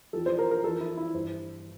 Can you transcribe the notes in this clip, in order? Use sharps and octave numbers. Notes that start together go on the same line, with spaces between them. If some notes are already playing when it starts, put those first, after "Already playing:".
F2 E3 A4
C5
A#4
A#4
F2 E3 A4
E4
E4
G2 E3 C5